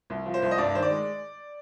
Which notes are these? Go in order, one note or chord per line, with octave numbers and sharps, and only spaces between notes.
C2
F3
C5
C2
D#5
G2 D5
D#3 C5
D5
G#3